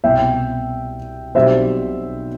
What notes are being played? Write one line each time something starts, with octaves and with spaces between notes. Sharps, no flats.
C2 B2 B3 E5 G5
B1 B2 G3 C4 C5 E5